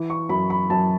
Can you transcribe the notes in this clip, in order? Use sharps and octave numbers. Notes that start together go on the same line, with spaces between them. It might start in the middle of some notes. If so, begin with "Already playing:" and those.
Already playing: E3
C#6
F#2 B5
B5
F#2 A5